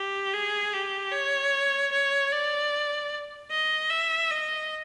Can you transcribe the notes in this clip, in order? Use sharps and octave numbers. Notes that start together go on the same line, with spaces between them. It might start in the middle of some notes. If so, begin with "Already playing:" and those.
Already playing: G4
G#4
G4
C#5
C#5
D5
D#5
E5
D#5